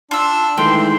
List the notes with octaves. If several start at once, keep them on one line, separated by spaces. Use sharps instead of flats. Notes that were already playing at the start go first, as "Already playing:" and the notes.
D4 F4 E6
D#3 E3 G#3 A3 G5 C6